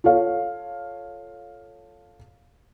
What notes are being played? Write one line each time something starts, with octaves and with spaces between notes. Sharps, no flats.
F4 A4 C#5 F5